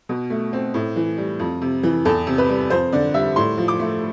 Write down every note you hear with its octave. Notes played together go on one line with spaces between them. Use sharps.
B2
A3
C4
A2
E3
G3
F2
C3
E3
E2 A4
C3
B4
G3
F2 C5
D3 D5
G3 E5
A2 C6
F3
D6
A3